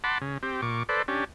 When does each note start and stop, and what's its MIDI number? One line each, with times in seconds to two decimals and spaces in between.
0.04 0.18 78
0.04 0.18 81
0.04 0.18 83
0.04 0.18 84
0.04 0.18 86
0.21 0.38 49
0.43 0.61 60
0.43 0.61 67
0.62 0.83 46
0.62 0.83 85
0.62 0.83 86
0.89 1.02 69
0.89 1.02 71
0.89 1.02 72
0.89 1.02 74
1.08 1.24 61
1.08 1.24 62
1.08 1.24 67